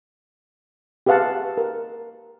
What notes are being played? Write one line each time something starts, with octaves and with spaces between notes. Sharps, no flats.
G4 G#4 B4 F5 F#5 A5
A#4